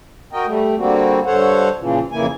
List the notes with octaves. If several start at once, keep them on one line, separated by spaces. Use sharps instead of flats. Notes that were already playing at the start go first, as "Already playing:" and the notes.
F#4 A#4 D#5 G5
G3 A3
D3 G3 A#3 C4 F#4
G2 D3 A4 C5 C#5 F#5
A#2 C#3 E3 F3
F2 C#3 E3 A#3 E4 G#5